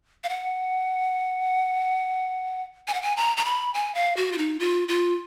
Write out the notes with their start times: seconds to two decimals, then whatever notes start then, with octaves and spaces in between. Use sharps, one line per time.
0.24 F5
0.29 F#5
2.88 G#5
2.94 F#5
3.02 G#5
3.17 A#5
3.37 A#5
3.45 B5
3.74 G#5
3.95 F5
4.17 F#4
4.32 F4
4.38 D#4
4.60 F4
4.88 F4